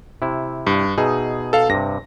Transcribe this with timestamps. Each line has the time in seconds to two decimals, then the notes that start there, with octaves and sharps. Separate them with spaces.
0.22 C3 E4
0.67 G2
0.98 B2 D#4 G#4 E5
1.53 A4 F5
1.70 G2 C3 A#6